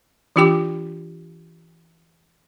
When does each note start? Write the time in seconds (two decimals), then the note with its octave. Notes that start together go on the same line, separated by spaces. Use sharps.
0.36 E3 D4 F4 G4 G5 D6